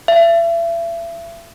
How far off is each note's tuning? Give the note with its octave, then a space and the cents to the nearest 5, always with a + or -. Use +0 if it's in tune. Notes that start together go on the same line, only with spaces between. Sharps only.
E5 +35